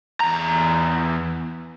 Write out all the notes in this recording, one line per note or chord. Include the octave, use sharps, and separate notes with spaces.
E2 A#5